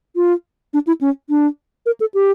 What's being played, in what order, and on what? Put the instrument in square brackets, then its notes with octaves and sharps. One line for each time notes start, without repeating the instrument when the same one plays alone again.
[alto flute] F4
D4
E4
C#4
D4
A#4
A4
G4